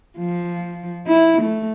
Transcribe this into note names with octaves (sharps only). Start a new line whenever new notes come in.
F3
E4
A3